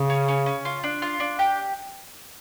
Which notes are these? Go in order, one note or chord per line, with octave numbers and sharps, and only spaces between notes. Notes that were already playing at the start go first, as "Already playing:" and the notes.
Already playing: C#3
C#4
C#4
C#4
F4
D4
F4
D4
G4